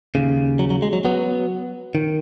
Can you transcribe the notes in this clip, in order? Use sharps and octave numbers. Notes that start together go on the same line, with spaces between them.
D#2 C#3
F#3
F#3
G#3
F#3
F#3 B3
D#3